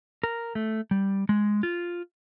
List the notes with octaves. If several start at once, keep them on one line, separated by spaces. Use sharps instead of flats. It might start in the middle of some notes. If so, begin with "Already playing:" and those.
A#4
A3
G3
G#3
F4